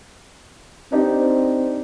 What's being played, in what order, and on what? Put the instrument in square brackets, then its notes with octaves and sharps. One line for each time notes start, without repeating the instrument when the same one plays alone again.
[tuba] C4 [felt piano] D4 D#4 G4